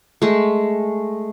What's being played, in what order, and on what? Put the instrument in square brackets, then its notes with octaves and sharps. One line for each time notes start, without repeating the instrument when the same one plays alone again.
[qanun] G#3 A3